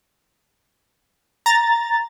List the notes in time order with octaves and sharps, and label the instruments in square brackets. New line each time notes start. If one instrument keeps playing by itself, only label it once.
[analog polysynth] A#5 A6